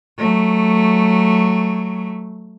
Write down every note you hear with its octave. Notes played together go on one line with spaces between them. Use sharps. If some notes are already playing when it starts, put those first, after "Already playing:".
F#3 A3